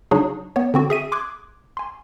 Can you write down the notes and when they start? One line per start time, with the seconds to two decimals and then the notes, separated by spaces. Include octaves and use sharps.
0.11 C#3 F#3 D4 D#4 F#4 G#4
0.56 B3 C#5
0.74 D3 C4 F#4
0.90 G#4 E5 D#7
1.12 C6 D6 D#6 F#6 G#6
1.77 G#5 C6